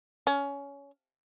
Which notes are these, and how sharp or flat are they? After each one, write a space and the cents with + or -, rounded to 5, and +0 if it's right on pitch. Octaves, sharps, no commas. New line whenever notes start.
C#4 +20